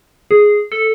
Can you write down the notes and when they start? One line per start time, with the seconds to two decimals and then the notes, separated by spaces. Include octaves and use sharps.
0.31 G#4
0.72 A4